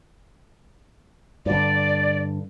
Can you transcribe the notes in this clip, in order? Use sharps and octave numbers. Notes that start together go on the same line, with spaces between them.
G2 D3 D5